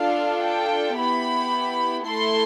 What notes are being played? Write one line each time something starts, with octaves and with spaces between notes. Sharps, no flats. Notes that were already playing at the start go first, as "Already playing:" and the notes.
Already playing: D4 F4 A4 F5
G5
B3 E4 G4 B5
A3 E4 A4 C6